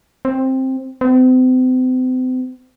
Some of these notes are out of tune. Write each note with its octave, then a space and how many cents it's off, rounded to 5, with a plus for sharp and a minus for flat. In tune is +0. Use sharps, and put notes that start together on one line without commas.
C4 +10
C4 -40